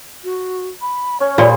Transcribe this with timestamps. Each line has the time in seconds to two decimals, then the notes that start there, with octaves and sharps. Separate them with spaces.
0.24 F#4
0.81 B5
1.20 C#4 C#5
1.38 A#2 F3 G3 F4 G#4 D5